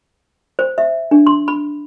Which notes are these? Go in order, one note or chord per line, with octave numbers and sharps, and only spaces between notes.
C5
E5
D4
C6
B5